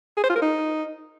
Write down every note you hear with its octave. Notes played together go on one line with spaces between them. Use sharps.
G#4
C5
F4
A#4
D#4